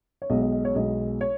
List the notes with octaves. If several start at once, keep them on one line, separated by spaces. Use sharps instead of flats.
C#5
B1 B2 G#3 D#5
D#5
D#5
C#5
B1 B2 G#3 D#5
C#5